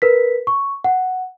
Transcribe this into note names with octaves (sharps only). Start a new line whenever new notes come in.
A#4 B4 B6
C#6
F#5